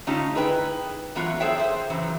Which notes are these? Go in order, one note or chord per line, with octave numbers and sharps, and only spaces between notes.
D3 A3 C#4 D#4 F4 G4
D#4 E4 G#4 B4 F#5 G5
E3 F#3 A3 B3 F4 F#4
G#4 A4 C5 C#5 E5 G5
G#4 C5
F#2 C#3 E3 F#3